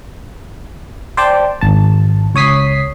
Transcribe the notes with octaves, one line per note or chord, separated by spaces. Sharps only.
C5 D5 G5 A5
G#1 A5
C#2 C#5 D#6 B6 C7